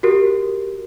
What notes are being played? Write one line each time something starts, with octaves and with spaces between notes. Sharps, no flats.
F#4 G4 A#4